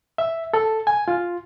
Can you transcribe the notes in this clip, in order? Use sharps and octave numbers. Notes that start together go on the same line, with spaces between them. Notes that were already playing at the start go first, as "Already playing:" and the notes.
E5
A4
G#5
F4